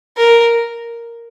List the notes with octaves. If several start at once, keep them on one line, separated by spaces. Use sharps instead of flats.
A#4